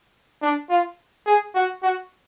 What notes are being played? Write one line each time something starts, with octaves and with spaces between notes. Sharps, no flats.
D4
F4
G#4
F#4
F#4